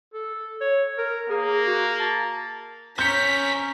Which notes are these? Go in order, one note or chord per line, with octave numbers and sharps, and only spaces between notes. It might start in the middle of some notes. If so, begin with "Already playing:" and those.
A4
C#5
A#4
A#3 G#4
F#4
A5
C4 C#4 A#4 G6 B6 C#7